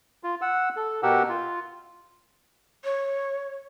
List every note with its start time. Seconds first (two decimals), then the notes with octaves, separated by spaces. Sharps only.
0.24 F4
0.42 F#5 E6
0.76 A4
1.03 B2 G4 A#4 F#5 E6
1.29 F4
2.84 C#5